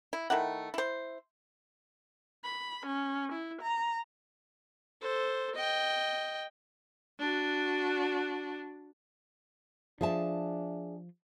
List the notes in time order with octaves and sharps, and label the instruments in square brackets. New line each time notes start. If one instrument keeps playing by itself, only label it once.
[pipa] E4
D#3 A3 E4 F#5
E4 C5
[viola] B5
C#4
E4
A#5
[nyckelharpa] A4 C5
D#5 G5
[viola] D4 F#4
[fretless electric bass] F3 [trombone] D4 [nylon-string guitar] G#4 E5 A5